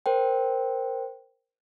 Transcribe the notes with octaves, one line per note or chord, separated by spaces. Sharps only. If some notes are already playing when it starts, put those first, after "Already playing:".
A#4 C5 G5